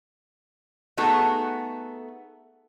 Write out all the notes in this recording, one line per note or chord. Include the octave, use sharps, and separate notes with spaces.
A3 B3 D#4 F#4 G#4 A4